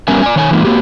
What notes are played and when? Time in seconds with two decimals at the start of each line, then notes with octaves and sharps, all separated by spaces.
0.08 G3 B3 C#4 A#4 E5 G#5
0.22 D5 G#5
0.36 D#3 C#5 G#5
0.50 D3 E3 G#3 A#3 C#4 E4
0.64 A#3 F#4 G4